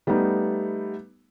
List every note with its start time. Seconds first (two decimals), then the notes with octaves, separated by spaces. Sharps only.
0.07 G3 A3 B3 D#4